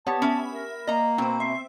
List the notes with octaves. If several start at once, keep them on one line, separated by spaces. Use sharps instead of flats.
B3 G4 C#5 A5
C#4 E5 B5
A#4
A#3 D#5 A#5
B2 C4 C5
E5 C6